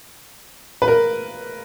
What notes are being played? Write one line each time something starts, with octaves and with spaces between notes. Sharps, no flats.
B4
A#4